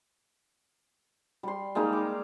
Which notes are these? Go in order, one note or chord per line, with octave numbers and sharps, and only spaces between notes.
G3 C6
G3 G#3 A#3 D#4
D6